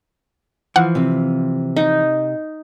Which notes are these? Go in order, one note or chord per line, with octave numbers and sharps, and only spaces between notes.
E3 F3 F#5
C3 C4
D#4